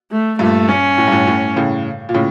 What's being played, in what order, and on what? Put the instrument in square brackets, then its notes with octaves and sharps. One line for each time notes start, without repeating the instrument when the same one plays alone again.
[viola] A3
[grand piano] G2 A#2 [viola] A3
[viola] C#4
[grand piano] A2
G2
A2
A2
A2 C#3
A#2
A2 C#3